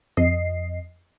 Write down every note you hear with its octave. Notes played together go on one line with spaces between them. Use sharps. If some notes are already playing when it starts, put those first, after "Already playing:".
F2 D#5 C7